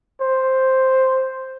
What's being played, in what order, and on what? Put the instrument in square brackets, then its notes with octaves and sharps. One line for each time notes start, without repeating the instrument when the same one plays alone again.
[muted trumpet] C5